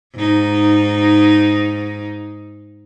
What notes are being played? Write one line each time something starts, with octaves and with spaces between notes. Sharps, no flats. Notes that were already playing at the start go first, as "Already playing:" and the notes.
G#2 D#4